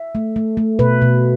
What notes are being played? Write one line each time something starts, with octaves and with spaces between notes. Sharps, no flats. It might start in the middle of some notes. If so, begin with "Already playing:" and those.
Already playing: E5
A3
A3
A3
B2 B4
B2